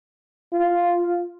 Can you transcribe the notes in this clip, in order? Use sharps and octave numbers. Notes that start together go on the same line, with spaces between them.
F4